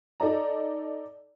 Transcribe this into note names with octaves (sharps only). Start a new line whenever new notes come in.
D#4 A4 D5 A#5